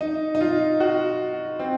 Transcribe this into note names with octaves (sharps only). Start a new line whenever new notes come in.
D#4
D#4
F4
F#4
C4